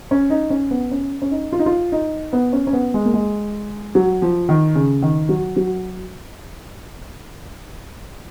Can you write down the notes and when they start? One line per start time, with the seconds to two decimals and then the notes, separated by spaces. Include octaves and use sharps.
0.11 C#4
0.30 D#4
0.50 C#4
0.71 B3
0.91 C#4
1.22 C#4
1.31 D#4
1.52 F4
1.59 D#4
1.66 F4
1.92 D#4
2.33 B3
2.53 C#4
2.67 C#4
2.73 B3
2.94 G#3
3.05 A#3
3.14 G#3
3.95 F#3
4.22 F3
4.49 D#3
4.75 C#3
5.02 D#3
5.29 F#3
5.57 F#3